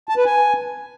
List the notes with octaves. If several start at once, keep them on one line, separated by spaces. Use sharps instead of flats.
A5
B4
G#5